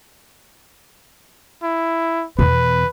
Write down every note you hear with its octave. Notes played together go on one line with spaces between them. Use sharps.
E4
E2 B2 B4